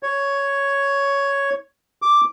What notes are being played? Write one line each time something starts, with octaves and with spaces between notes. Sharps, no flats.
C#5
D6